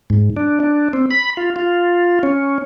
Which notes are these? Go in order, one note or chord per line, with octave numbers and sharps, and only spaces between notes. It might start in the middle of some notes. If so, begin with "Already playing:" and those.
G#2
D4
D4
C4
B5
F4
F4
C#4